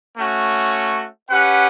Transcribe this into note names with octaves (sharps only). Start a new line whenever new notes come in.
A3 C#4 F#4
C#4 G4 B4 F#5